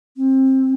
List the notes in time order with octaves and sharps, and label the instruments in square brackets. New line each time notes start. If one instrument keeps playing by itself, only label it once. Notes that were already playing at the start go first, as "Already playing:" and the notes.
[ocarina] C4